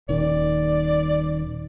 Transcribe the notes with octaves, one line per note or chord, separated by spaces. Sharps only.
D#1 D#3 D5